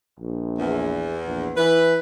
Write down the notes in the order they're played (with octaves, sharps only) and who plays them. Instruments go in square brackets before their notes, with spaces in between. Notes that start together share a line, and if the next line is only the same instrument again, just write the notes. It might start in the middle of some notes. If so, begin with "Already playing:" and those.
[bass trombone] A#1
[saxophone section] E2
[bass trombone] A#1
[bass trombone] E3 [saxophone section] B4